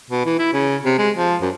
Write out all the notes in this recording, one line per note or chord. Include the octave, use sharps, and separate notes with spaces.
B2
E3
E4
C#3
C3
G#3
F3
F#2